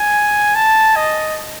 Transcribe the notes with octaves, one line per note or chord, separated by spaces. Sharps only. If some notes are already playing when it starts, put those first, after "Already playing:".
Already playing: G#5
A5
D#5